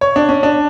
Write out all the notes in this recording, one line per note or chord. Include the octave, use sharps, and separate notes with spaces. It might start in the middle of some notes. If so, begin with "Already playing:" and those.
C#5
D4
C#4
D4